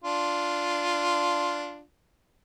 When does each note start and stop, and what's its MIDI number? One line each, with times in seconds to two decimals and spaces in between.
0.04 1.82 62
0.04 1.82 65